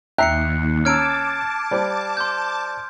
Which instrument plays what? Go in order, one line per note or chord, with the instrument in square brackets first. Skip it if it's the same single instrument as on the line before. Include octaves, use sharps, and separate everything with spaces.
[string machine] D#2 [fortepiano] E5 G5 A#5 [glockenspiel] F#6 C7 C#7
[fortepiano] C#4 A#5 E6 [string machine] A5 D6 [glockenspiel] F6 G#6 D7
[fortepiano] G3 C5
[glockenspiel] C6 G6